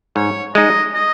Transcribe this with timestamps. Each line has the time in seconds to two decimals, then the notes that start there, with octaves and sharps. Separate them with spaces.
0.16 G#2 C#5
0.55 G#3 D#4 D#5
0.94 D#5